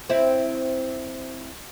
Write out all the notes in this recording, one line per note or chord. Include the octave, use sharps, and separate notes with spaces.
C4 E4